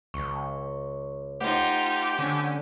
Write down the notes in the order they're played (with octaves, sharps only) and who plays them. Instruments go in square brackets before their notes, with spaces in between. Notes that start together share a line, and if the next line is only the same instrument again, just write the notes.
[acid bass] C#2 [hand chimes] C#6
[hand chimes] A3 C5 F#5 [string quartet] D#4 F4 [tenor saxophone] G4
[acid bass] D3 [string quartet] C#4